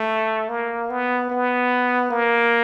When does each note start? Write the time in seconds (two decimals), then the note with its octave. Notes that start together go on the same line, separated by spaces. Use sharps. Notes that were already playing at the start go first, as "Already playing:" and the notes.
Already playing: A3
0.49 A#3
0.90 B3
1.30 B3
2.11 A#3